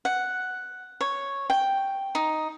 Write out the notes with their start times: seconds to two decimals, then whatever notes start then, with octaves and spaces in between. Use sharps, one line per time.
0.05 F#5
1.01 C#5
1.50 G5
2.15 D#4